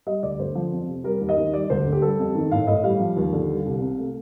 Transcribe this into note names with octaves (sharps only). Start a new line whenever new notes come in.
G3 D#5
D2 D5
D3 C5
F3
F2
C3
G3 A#4
D#2
D#5
D#3
G3 D5
D2 C5
D3
G4
G3 A4
F2
D#3
A2 F5
A2 D#5
G3 F5
F3
D#2
D3
G3
C2
C3
A3